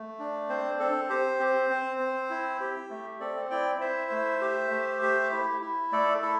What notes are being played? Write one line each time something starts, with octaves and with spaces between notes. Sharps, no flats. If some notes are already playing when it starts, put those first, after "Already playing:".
Already playing: A3
D4
C4 C5
C4 A4
G4 C5
C4
C4
C4
E4
G4
A3
C4 A4 D5
E4 D5 G5
E4 C5 E5
A3
G4
A3
G4
E4
E4
A3 A4 D5
E4 A4